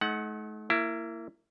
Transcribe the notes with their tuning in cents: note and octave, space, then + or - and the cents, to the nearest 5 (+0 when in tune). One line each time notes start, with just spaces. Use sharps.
A3 -45 D#4 +30 F#5 +5
A#3 -20 E4 +15